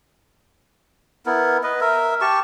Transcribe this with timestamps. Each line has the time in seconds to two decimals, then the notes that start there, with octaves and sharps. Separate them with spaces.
1.26 B3 E4 A#4
1.63 B4 D#5
1.81 A#4 E5
2.21 G4 A5 C#6